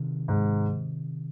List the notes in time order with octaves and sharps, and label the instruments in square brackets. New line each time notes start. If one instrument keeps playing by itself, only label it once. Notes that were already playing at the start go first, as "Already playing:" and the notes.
Already playing: [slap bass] C3 D#3
[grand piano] G#2